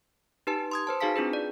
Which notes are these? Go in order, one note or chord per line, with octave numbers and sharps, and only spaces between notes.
D#4 G4 B4 A5
C6 D#6 G#6
B4 C5 A5
D#4 F#4 G#4 F5 A5 B6
C4 D4 F4 G#4 B4
D5